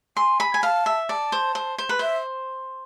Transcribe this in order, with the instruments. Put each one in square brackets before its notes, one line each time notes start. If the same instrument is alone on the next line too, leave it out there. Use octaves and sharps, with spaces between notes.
[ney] G#5 [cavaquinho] C6
[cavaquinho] B5
G#5
[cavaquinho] F5 [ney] A5
[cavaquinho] E5
[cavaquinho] D5 [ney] A5
[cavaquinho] C5
C5
C5
B4
[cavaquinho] C5 [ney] E5